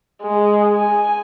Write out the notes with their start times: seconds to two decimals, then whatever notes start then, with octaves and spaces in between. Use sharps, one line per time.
0.23 G#3
0.77 G#5